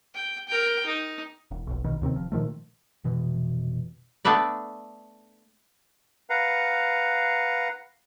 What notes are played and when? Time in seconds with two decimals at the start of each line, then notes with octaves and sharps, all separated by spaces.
0.14 G5
0.48 A#4 G5
0.86 D#4
1.51 E1
1.67 F1 B1
1.84 D1 A#1 B2 D#3
2.02 D#2 C3 D#3 C4
2.15 F1 F3
2.32 A#2 D#3 F3 A3
3.04 F1 B2 E3
4.25 A3 B3 D4 B4 D5
6.30 B4 F5 F#5 A#5